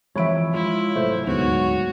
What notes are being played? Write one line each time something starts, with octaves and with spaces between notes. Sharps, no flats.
F2 E3 C#5 E5 B5 D7
G#3 E4 F4
G#1 C3 F#3 A3 C5
D#1 D2 G#2 D3 F#3 B3 F#4 C#5